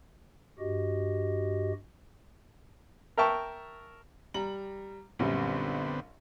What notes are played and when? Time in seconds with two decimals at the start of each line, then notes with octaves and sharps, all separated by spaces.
0.59 G2 F#4 G4 D#5
3.17 A#4 E5 G5 A5 C#6
4.34 G3 A#5 F#7
5.19 A#1 F#2 D3 G3 B3 C4